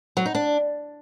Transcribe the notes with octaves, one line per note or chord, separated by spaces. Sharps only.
F#3
D#4
D4